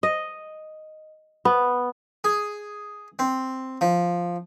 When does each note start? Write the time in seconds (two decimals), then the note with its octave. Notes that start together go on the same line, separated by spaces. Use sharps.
0.03 D#5
1.45 B3
2.24 G#4
3.19 C4
3.81 F3